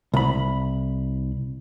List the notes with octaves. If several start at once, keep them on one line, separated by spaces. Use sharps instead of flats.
C2 B5